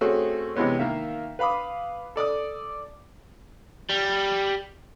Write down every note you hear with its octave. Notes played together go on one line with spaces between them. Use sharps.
A3 C4 C#4 F#4 G#4
C3 E3 G#3 B3 C#4
D#3 A#3 E5 F5
B4 F5 B5 D6 D#6
A4 D5 D6 D#6
G3